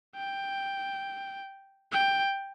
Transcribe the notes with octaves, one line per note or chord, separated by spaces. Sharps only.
G5
G5